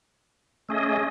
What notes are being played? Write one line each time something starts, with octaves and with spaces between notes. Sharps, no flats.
A3 C#4 G#4 D#5